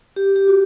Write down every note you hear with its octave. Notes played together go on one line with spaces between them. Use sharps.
G4
G4
F#4